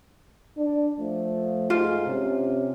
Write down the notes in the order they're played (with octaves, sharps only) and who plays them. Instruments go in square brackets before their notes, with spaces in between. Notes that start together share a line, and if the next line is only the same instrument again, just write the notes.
[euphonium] D4
[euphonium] F3 [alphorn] A3
[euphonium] G#2 [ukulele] F4
[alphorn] C3 [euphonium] C#4